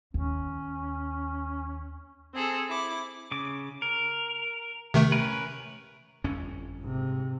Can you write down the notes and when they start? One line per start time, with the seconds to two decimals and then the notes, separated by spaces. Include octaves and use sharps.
0.14 D#2 C#4
2.34 C4 G#4 A4
2.69 E4 D6
3.32 C#3 D6
3.82 A#4
4.94 C3 D#3 A3
5.12 C#4 A#4 B4
6.24 G1 F2 C#4
6.81 G#2 C3